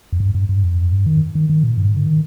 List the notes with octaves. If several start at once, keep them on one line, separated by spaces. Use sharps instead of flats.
F2
G2
G2
G2
F2
G2
D#3
D#3
D#3
A#2
G2
G#2
D3
D#3